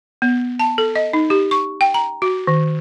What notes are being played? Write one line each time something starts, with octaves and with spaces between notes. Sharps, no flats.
B3
A5
A4
D#5
D#4
G4
C#6
G5
A#5
F#4
D#3